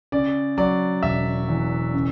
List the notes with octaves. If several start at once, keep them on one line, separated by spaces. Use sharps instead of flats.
C#3 D5
F#3 D5
E1 E5
E2
C#3